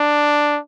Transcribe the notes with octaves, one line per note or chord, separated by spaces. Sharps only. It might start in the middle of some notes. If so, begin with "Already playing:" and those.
Already playing: D4